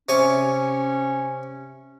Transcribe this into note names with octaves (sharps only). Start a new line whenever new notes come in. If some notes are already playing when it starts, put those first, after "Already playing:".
C3 C#4 C#5 G#5